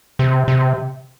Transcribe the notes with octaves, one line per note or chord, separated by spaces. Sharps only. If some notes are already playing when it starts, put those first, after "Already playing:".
C3
C3